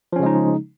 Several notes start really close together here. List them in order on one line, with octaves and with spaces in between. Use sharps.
F3 C#4 C#3 G#3 D#4